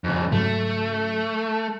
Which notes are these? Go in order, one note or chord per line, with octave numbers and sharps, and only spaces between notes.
F2 C#3
G#2 C#3 F#3 A3